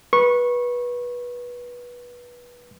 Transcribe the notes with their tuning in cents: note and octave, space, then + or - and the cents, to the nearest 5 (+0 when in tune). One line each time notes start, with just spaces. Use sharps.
B4 -20 C#6 -20